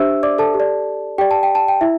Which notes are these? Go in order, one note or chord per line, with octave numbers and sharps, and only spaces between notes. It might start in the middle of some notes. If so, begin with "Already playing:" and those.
Already playing: D4 G4 C5 E5 E6
D5 D6
A4 A5
G4
D5
G4 D5 G5
A5
G5
A5
G5
E4 E5